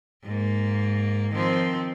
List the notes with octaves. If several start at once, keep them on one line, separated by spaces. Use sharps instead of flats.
G#2 A#3
D#3 F3 C4